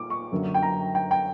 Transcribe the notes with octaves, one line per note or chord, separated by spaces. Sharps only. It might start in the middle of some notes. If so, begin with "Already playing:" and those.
Already playing: A#2 D6
C#6
F#2 D3 F#3 A#3
G5
A#5
G5
G5